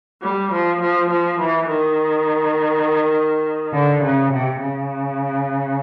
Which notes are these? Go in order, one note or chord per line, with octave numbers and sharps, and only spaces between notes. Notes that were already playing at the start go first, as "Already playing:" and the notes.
G3
F3
F3
F3
E3
D#3
D3
C#3
C3
C#3